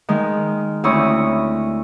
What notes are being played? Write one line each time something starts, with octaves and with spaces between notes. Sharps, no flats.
D#3 G#3
D2 C4 C#4 E4 C#5 D#6